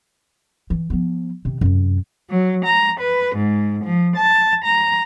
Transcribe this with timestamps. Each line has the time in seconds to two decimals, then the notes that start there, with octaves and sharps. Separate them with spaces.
0.70 E3
0.90 F3 B3
1.45 C3 D#3
1.61 F#2 C3
2.31 F#3
2.66 A#5
3.00 B4
3.37 G#2
3.85 F3
4.17 A5
4.64 A#5